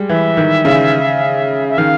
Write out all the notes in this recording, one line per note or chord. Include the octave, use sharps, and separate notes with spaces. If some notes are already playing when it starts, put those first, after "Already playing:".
Already playing: G3 G#3
E3 E5
D#3
C#3
E5
D#3 F5